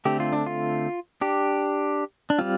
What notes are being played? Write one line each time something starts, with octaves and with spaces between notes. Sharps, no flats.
D3 A3 C4 G4
F4
D4
F4
D4 G4
D4
G3 C4 F4